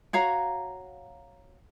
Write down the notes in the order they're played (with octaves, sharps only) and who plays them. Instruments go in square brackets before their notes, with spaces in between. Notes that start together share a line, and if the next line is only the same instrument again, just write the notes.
[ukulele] F#4 C#5 F5 A#5